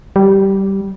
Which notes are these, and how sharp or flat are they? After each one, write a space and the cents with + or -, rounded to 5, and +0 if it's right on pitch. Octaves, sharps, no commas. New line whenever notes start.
G3 -10